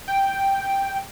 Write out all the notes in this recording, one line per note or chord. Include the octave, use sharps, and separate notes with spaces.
G5